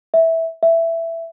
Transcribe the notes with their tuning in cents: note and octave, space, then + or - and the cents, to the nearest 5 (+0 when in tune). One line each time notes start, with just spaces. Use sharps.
E5 -10
E5 +10